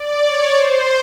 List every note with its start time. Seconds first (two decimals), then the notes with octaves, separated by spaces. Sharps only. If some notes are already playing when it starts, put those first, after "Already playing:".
Already playing: D5
0.24 C#5
0.56 C5